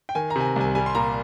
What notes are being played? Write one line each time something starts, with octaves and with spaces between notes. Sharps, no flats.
G5
D#3 G#5
A#5
C3 G#5
A#5
C2 G#5
G3 G#5
C6
A#2 A#5